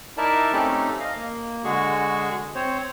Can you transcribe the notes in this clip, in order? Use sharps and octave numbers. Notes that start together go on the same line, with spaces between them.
D#4 E4 A#4 D5 E5 A5
A3 C4 C#4 D#4 G4 A4
D#5 F5
A#3
D3 G#3 F#4 G#4 C#6
C4 C5 C#5